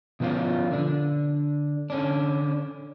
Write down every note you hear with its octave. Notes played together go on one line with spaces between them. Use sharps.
B2 F3 B3 C#4 F4
D3 D4
D3 C#4 D4